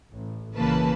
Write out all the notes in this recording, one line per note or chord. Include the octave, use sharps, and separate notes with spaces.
A1
B1 C#3 E3 A#3 B4 A5